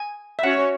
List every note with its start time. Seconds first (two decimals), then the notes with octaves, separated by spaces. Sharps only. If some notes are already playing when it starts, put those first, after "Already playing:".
Already playing: G#5
0.39 E5
0.43 C#4 F#4 C#5 F#5